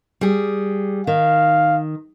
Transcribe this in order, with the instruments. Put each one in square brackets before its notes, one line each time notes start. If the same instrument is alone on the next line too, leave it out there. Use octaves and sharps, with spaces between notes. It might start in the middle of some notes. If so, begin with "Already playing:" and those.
[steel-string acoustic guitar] G3 G#4
[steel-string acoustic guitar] D#3 [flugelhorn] F5